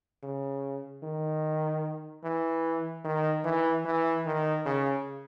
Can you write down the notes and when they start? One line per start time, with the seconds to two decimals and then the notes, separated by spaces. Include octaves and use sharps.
0.23 C#3
1.03 D#3
2.24 E3
3.04 D#3
3.45 E3
3.85 E3
4.25 D#3
4.66 C#3